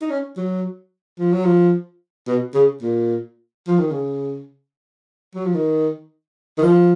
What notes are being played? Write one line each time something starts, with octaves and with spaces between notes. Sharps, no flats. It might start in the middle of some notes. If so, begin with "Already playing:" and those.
D#4
C#4
F#3
F3
F#3
F3
B2
C#3
A#2
F3
D#3
C#3
F#3
F3
D#3
D#3
F3